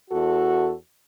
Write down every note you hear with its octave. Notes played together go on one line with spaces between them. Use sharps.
E2 F#4 A4